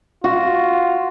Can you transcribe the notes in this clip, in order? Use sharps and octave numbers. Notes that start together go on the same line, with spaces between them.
F4 F#4